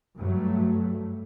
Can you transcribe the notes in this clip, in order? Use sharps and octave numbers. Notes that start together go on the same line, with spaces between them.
G2 F#3 A3